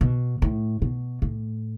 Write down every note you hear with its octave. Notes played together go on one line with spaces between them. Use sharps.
B2
A2
B2
A2